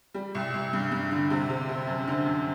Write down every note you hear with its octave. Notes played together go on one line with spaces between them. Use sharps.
G3
C2
C2
G2
G2
D3
C3
C3
C3
F#2
D3
F#2